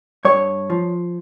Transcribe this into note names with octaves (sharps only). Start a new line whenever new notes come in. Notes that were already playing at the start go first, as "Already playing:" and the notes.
G2 C#5
F3